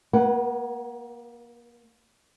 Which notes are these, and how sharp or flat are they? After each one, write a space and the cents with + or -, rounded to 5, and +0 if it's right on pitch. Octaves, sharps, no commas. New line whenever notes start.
A#3 +30 B4 -25 F#5 +15